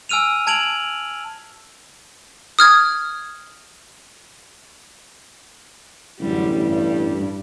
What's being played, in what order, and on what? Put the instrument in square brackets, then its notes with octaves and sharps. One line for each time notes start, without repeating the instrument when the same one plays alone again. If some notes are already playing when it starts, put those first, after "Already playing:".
[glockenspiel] G#5 E6 F6 D#7 F7
A5 G#6 D7 F7 F#7
[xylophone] D#6 F6 G#6
[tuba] A1 [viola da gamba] F#2 D3 G3
[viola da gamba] G2